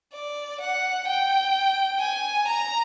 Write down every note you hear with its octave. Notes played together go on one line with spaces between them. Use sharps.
D5
F#5
G5
G#5
A#5